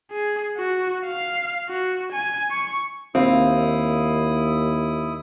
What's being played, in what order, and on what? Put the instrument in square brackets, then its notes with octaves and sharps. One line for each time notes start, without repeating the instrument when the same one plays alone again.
[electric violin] G#4
F#4
F5
F#4
G#5
C#6
[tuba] D#2 [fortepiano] C4 [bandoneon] E4 D#6 [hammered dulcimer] F5